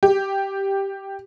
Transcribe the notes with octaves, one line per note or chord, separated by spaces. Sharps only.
G4